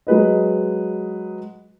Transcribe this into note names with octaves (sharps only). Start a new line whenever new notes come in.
F#3 G#3 B4 D#5